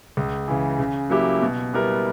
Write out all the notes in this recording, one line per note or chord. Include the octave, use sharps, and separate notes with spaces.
C#2
C#3 E3
C#3
F#3 A#3 E4 G4
B2
G3 B3 E4 A#4